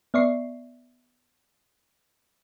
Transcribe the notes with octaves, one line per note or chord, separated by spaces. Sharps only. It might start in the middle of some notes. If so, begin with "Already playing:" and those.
B3 D5 E5 C#6 C7